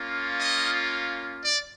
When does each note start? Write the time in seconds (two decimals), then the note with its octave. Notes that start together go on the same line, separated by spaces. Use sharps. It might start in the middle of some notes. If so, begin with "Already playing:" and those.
Already playing: A#3 C#4 F4
0.40 D#5
1.44 D5